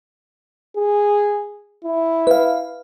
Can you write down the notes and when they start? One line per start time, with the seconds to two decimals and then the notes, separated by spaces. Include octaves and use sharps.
0.76 G#4
1.84 E4
2.27 B4 F5